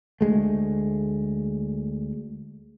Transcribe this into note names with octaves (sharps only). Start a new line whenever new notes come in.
D2 G#3 A3